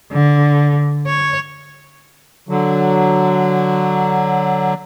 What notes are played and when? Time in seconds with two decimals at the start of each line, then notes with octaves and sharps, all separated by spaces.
0.12 D3
1.07 C#5
2.49 D3 F#3